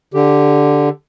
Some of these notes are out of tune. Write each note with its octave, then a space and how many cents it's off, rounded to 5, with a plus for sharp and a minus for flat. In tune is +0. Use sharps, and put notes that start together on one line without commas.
D3 +0 G4 +0